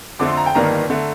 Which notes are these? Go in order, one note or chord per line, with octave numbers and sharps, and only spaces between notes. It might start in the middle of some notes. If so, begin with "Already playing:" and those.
F2 D3 A3 D6
C6
A#5
G5
G1 G2 D#3 A#3 D4 A#5
D3 A3